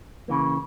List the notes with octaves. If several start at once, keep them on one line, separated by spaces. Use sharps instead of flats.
C#3 E3 A#3